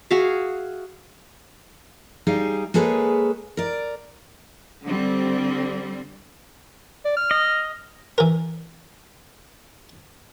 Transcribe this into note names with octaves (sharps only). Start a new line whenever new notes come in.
F#4 G#4 E5 F5
G3 D#4 G#4 F5
G#3 A#3 G#4 A4 B4 C#5
A#4 D5
D3 G3 C4
D5
F6
D#5
E3 A#4